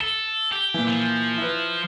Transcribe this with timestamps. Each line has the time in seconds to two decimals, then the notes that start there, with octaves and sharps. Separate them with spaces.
0.01 A4 G7
0.52 G4
0.74 A#2 E3
0.88 F3
1.38 E4 B4